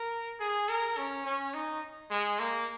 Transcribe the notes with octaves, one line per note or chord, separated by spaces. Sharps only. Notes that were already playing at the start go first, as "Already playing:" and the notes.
Already playing: A#4
G#4
A#4
C#4
C#4
D#4
G#3
A#3